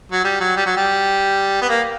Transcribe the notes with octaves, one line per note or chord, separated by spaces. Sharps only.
F#3
G3
F#3
G3
F#3
G3
B3
A#3